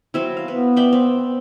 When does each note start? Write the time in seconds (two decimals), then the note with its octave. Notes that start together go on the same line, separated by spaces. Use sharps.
0.14 F#3 C4 E4
0.37 F5
0.48 B3 B4
0.76 D5 E5 G5
0.93 C4